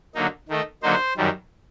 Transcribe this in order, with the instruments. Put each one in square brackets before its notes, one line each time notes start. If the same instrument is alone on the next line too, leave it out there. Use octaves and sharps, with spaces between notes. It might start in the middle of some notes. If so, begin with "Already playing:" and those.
[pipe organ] D3 F#3 A#3 D#4
D#3 A3 D#4
D3 F#3 A#3 D#4 C5
F#2 D#3 G3